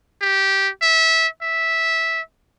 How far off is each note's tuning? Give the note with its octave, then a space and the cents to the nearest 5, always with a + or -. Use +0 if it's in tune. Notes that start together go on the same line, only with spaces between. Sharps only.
G4 -10
E5 -20
E5 -10